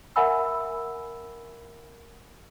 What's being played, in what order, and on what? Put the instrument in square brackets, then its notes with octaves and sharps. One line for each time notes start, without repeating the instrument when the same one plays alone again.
[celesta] A#4 E5 F#5 G#5 B5 E6